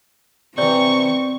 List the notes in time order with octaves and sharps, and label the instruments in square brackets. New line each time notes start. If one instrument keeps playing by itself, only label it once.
[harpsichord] C3 E3 [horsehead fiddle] C4 [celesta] D5 [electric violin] C#6